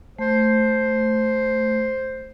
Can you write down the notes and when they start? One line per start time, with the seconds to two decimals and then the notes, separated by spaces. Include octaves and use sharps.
0.19 A3 C5